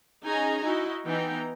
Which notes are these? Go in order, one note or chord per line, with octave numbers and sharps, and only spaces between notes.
C#4 D#4 G#4 D#5 G#5 A#5
D#4 E4 F#4 D#5
E3 B3 D#4 G5 A#5